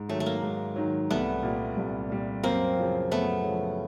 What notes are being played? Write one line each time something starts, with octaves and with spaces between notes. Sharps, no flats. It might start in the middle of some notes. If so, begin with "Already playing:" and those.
Already playing: G#2
D#3 F#3 A3
A3
A#3
G#2
D#3 F#3
C2 A3 B3
A#2 G3
C2
A#2 G3
F#2 A#3 C4
C#3 F3
F#2 A3 B3
C#3 F3